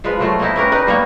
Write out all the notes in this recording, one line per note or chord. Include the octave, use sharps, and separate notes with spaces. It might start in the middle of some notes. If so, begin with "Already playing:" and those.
F3 G#3 F4 B4
F3 F#3 A3 F4
A#3 C4 D#4 E4
C#4 G4 A#4 B4
D#4 B4 D5
G3 A#3 B3 C#5